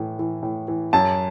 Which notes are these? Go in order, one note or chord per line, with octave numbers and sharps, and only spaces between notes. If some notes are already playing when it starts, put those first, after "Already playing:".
Already playing: A2 E3
E3
A2
E3
F#2 A5